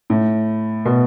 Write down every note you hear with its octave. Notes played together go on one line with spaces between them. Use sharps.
A2
B2